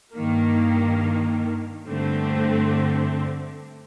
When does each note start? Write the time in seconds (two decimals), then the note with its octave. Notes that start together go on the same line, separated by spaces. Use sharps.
0.15 G2 D#3 A#3
1.86 G2 D3 A3 C4